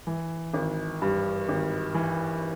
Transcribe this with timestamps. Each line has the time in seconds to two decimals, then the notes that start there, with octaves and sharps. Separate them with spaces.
0.07 E3
0.54 G#1
1.02 G2
1.49 G#1
1.95 E3